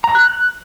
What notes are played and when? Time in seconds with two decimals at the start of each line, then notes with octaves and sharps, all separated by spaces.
0.04 A#5
0.15 F#6
0.26 F#6